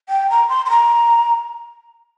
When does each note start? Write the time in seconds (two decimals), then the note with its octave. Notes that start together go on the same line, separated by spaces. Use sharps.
0.09 G5
0.30 A#5
0.49 C6
0.66 C6
0.70 A#5